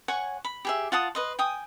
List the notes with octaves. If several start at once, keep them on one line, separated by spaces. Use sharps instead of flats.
C#5 F#5 G#5 C#6
B5
G4 G#4 E5
F4 F#5 A5 D#6
B4 D#5 C6
G5 G#5 D#6